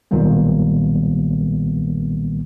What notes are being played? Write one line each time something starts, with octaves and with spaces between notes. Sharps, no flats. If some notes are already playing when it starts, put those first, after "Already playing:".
B1 A#2 D#3 G3 A#3 B3